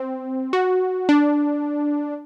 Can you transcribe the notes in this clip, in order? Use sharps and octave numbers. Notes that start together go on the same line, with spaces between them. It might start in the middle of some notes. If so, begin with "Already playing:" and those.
Already playing: C4
F#4
D4